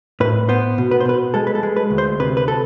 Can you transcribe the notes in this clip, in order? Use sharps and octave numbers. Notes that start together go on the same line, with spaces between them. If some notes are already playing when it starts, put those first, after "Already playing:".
A2 B4
B3 C5
B2
B4
C5
B2 B4
G#3 A4
B4
A4
G#3
B4
D2
C5
C3 B4
B4
A4